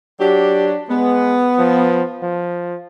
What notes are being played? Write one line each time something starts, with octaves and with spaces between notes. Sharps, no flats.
F#3 D4 G4
G#3 B3
F3
F3